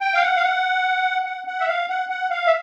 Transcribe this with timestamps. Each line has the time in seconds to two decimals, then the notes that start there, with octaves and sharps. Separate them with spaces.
0.01 G5
0.14 F5
0.22 F#5
0.36 F5
0.42 F#5
1.26 F#5
1.47 F#5
1.60 E5
1.67 F5
1.89 F#5
2.09 F#5
2.31 F5
2.47 E5